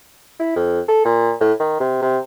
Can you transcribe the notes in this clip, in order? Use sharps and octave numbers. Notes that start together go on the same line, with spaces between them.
E4
F2
A4
A#2
A2
D#3
C3
C3